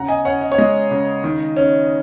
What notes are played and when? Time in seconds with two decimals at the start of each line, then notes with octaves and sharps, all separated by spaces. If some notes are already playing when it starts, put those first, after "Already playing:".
Already playing: C#3 F#5 A#5
0.08 D#5 G#5
0.25 C#4 C#5 F#5
0.41 D#5
0.52 C#5
0.58 G#3 D#5
0.91 C#3
1.24 D#3
1.56 C#4